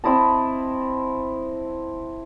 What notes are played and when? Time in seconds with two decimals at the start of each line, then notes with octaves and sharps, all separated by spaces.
0.04 C4 E4 D#5 A5